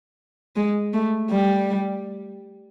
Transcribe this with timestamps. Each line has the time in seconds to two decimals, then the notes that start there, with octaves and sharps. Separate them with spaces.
0.56 G#3
0.93 A3
1.30 G3